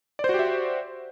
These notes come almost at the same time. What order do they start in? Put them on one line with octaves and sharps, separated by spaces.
D5 C5 F#4 G4 E5